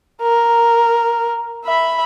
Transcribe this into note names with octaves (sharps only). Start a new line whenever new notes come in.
A#4
E5 B5